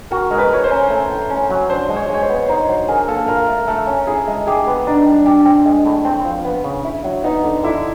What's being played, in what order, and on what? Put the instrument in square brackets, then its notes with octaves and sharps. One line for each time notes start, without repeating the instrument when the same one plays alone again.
[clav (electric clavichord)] F#4 [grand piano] A#4
[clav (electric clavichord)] G#3 [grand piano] A#4
[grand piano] B4
[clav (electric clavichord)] A#4 [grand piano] C#5
[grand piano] C5
[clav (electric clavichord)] C#4
A3
A2
C#4
F#3
[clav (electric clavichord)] D4 [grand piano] C5
[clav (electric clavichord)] G#3
[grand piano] C#5
[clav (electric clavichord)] G#3 [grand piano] C#5
[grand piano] C5
[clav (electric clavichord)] B3
[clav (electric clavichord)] D#4 [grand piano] C5
[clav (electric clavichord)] F#3 [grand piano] C5
[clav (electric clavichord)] G#4 [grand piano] A#4
[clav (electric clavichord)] A#3 [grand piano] A4
[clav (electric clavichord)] F4 [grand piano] A#4
[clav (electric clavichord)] A3
[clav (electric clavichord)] A3 [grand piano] A4
[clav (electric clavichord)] C#4
[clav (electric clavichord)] E4 [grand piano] G#4
[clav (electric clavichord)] G#3
[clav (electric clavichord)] G4 [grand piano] G#4
[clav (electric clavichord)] B3
[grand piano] D4 [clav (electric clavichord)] D#4
[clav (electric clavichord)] G3
[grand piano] D4 [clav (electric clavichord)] G4
[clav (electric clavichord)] C4
G#3
A2
C4
F3
B3
C#3
E4
F#3
[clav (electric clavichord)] B3 [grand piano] D#4
[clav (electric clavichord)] D3
[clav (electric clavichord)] D3 [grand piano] E4